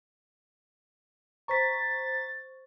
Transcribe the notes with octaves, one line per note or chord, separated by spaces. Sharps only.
C5 A#5 C#6 A6 B6